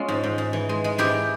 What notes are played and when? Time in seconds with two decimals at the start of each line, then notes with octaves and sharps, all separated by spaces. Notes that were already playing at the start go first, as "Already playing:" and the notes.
Already playing: G#3 C#4 F4
0.08 G#2
0.24 G#2
0.38 G#2
0.53 E3
0.69 G#3
0.84 G#3
0.98 G#2 E4 G4